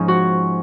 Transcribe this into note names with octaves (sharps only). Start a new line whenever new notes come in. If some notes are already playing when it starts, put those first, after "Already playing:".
Already playing: G#2 F3 C#4 D#4
F#4